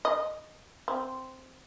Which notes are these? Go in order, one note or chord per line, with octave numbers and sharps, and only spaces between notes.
D#5
C4